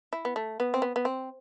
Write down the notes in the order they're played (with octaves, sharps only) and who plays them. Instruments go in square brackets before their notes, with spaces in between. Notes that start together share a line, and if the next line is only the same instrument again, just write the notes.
[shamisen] E4
B3
A3
B3
C4
B3
B3
C4